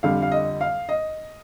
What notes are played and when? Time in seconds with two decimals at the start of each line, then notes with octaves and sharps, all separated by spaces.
0.03 F2 D3 G3 F5
0.22 F5
0.32 D#5
0.61 F5
0.89 D#5